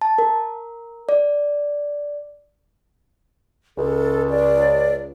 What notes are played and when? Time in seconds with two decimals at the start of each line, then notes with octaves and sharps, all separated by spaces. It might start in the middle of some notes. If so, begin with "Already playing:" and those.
0.01 A5
0.18 A#4
1.09 D5
3.78 C#2 A4
4.30 D5